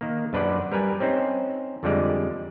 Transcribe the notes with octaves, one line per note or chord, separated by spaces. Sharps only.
D#3 A#3
F#2 D4 B4 C5 D5 F#5
G3 A#4 B4 G#5
C4 C#4 D#4 C5
F2 D3 F3 G3 G#3 D5